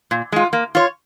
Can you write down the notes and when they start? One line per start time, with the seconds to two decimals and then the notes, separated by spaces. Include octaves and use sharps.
0.11 A#2
0.32 G#3 F4
0.53 A#3
0.75 F4 C#5